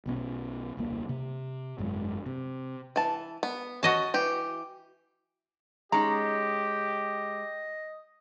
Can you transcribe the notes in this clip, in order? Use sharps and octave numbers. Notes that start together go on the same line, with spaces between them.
B1 B2 F3 C#4
D#1 C2 A#3
C3
G#1 F#2 G#3
C3
E3 A5
B3
C#4 F#4 D#5 A5
E3 G4
G#3 C#4 D#4 G4 D#5 A#5